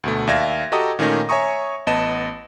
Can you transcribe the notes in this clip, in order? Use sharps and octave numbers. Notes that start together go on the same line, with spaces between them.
D2 B2 A3
D#2 D5 E5 F5 G#6 A#6
F#4 G4 A4 D#5 A#5 D#6
A#2 D#3 A3 C#4 D#4 A#6
C#5 E5 G#5 A#5 C#6 D#6
A1 B3 D#5 A5 E7